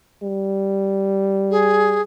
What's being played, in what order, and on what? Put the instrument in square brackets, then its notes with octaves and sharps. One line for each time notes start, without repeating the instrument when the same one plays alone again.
[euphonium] G3
[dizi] G#4